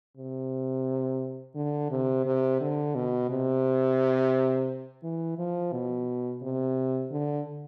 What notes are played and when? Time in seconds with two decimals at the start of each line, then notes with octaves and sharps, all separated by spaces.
0.17 C3
1.55 D3
1.91 C3
2.26 C3
2.60 D3
2.95 B2
3.30 C3
5.03 E3
5.38 F3
5.72 B2
6.42 C3
7.11 D3